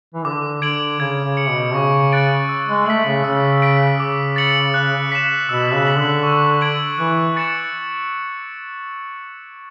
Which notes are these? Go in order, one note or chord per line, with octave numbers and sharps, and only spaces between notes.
E3
D3 D6
D3 G#6 D7 F#7
C#3 G#6
C#3
C#7 F#7
B2
C#3 C#6
F#6 A6 D7 F#7
E6
G#3
A3 B6 F#7
C#3
C#3 E6
B6 D7
C#3 D6
A6 C#7 F#7
F#6
B6 E7
B2 E6
C#3
B6 F#7
D3
C#6
G#6 D7 F#7
E3 F#6
A6 C#7 E7